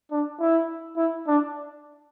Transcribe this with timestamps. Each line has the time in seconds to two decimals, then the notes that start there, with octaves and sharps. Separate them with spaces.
0.11 D4
0.40 E4
0.97 E4
1.27 D4